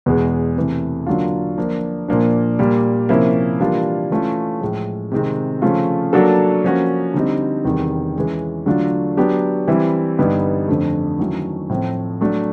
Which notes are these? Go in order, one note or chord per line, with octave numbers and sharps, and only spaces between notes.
E2 B2 G#3 B3
C3 E3 A3
D3 F#3 A#3 D4 F4
F3 A#3 D4
A#2 F3 A#3 D4
A#2 G3 A#3
C3 F3 A#3 C#4 E4
E3 G3 A#3 D4 F4
E3 A3 C#4 F4
A2 F3 G#3
C3 D#3 G#3 C4 D#4
C#3 F3 A3 C#4 F4
F#3 A#3 D4 F#4 A4
F3 A#3 C#4 F#4
D3 G3 C4 D#4
E2 C3 D#3 G3
E3 G#3 C#4
D3 F#3 A3 D4 F4
F#3 B3 D4 G4
E3 G3 C4 E4
G2 D3 G3 B3 D#4
F2 D3 F3 A3
D#3 F#3 A3 C#4 E4
A2 F3 A3 C4
F#3 A3 D4